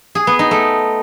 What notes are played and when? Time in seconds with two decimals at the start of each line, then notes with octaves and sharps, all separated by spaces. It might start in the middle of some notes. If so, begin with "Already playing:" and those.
0.15 G#4
0.27 B3
0.39 D#4
0.51 A3